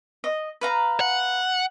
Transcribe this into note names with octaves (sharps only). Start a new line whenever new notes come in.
D#5
B4 F5 A#5
F#5